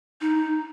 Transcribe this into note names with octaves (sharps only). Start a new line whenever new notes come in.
D#4